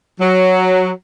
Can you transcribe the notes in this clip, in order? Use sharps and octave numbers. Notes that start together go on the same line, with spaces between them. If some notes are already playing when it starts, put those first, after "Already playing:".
F#3